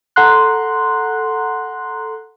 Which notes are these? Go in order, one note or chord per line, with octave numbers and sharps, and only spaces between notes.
A4 F#5 A#5 C6 F#6